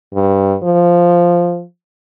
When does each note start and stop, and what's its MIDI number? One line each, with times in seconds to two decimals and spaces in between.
0.14 0.55 43
0.63 1.63 53